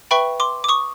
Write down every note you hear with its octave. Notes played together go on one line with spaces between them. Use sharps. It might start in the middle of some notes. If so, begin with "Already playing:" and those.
B4 E5 G5 B5 C#6
C6 D6
D6
C#6 D#6